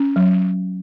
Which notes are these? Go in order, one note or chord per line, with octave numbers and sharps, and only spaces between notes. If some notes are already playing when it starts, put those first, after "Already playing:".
Already playing: C#4
F#3